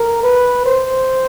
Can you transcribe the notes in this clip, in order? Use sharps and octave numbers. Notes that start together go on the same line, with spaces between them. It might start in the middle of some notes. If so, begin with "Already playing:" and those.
Already playing: A#4
B4
C5